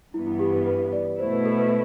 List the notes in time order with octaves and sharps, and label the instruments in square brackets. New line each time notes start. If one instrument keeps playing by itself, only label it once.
[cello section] G2 E3 B3 [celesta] E4
[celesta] E4
G4
B4
B4
D5
[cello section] B2 A3 E4 [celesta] C5
[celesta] B4
A4
B4